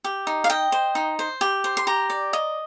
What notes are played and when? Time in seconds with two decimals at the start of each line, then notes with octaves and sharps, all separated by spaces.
0.04 G4
0.27 D#4
0.44 F5
0.50 D#5 G5
0.72 C5
0.95 D#4
1.19 C5
1.41 G4
1.64 C5
1.77 C6
1.87 G4 A#5
2.10 D5
2.33 D#5